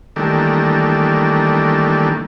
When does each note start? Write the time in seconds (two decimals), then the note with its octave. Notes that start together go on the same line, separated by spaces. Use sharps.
0.16 D#3 E3 G3 A3 A#3 D4